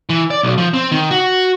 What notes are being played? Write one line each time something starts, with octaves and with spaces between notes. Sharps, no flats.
E3
D5
B1
F3
C4
D#3
F#4